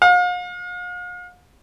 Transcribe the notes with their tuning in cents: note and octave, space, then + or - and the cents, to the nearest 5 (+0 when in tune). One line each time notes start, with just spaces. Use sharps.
F5 +40